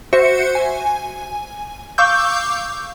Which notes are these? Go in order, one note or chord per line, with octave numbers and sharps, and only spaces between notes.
F#4 C5 E5 C#7
G#5
F5 C#6 D6 E6 G6